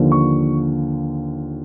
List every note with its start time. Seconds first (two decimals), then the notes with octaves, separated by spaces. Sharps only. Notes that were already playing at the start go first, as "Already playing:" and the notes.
Already playing: D#2 D3 F3
0.12 C#6